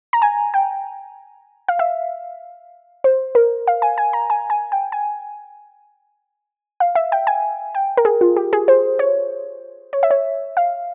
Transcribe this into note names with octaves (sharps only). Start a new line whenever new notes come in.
A#5
G#5
G5
F5
E5
C5
A#4
F5
G#5
G#5
A#5
G#5
G#5
G5
G#5
F5
E5
G5
G#5
G5
A#4
G#4
F4
G4
G#4
C5
C#5
C#5
E5
C#5
F5